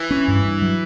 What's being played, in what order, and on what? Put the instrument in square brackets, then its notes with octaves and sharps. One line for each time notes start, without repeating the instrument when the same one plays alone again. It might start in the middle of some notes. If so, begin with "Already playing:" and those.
Already playing: [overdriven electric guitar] E3
[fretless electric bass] C#4
G2
G2
F#3